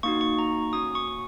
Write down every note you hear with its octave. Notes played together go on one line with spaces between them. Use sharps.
A#3 D#4 F#4 C#6
C#6
A#5
A#3 C#4 F#4 D#6
C#6